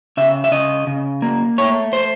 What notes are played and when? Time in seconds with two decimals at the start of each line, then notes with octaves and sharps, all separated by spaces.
0.17 C#3 E5
0.44 E5
0.52 C#3 D#5
0.87 C#3
1.22 A#3
1.58 A3 C#5
1.93 C5